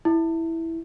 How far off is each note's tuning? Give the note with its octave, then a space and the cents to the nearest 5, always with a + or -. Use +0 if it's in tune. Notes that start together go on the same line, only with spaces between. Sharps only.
E4 -5